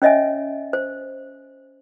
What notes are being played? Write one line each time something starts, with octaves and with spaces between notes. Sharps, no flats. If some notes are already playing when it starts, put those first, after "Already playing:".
C#4 C#5 D#5 E5 G#5
C5